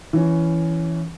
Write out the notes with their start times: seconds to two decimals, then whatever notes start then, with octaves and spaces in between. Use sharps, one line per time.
0.13 E3 C#4